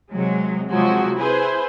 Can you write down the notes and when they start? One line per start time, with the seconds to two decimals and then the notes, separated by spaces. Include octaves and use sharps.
0.13 C3 F#3 G#3
0.70 C3 F3 F#3 G#3 F#4
1.18 E4 G#4 B4 C5